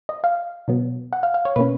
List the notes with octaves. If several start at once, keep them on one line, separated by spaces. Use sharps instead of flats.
D#5
F5
B2 F#3 B3
F#5
F5
F5
C#5
B2 A#3 C#4 B4